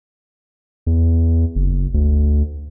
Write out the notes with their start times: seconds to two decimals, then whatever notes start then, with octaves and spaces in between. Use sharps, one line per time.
0.87 E2
1.55 F#1
1.94 D2